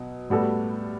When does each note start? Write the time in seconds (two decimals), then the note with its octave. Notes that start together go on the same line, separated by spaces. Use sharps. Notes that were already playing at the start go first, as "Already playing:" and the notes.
Already playing: B2 F#3
0.30 A2 G3 B3 F#4 A4